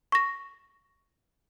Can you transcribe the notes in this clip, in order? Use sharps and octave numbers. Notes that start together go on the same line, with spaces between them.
C#6 A#6